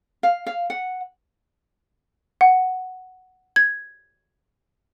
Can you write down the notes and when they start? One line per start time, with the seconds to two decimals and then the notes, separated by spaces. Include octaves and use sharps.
0.23 F5
0.46 F5
0.70 F#5
2.41 F#5
3.56 G#6